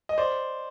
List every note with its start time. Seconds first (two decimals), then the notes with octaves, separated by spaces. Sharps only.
0.09 D#5
0.18 C5 D5